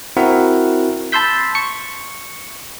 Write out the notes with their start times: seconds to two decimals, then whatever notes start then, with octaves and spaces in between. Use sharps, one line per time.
0.17 C4 E4 F#4 A#4 F#5
1.12 A5 B5 C6 E6 G6 B6
1.55 C#6 C#7